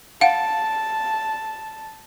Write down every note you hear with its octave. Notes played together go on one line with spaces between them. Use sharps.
F5 F#5 A5